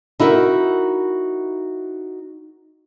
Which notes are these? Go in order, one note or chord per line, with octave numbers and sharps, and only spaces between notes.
D#4 E4 F#4 A#4 E5